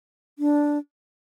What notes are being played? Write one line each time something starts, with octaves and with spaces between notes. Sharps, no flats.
D4